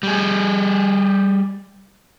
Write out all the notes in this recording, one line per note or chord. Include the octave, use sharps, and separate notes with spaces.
G3 G#4